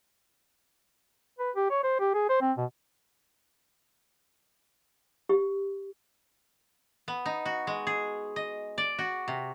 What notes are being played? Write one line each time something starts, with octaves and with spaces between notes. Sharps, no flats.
B4
G4
C#5
C5
G4
G#4
C5
C4
B2
G4
B3
D#4
F#4
G#3
G#4
D#5
D5
F#4
C3